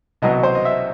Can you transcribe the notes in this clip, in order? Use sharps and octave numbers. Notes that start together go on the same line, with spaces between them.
C2 B2 F#3 D#5
C5
D#5
E5